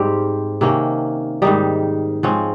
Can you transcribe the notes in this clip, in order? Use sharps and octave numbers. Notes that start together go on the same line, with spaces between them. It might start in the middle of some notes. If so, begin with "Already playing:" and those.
Already playing: G#2 G3 C4 G4
C3 D#3 A#3 C#4
G#2 D#3 G3 D#4
G#2 F3 C4 C#4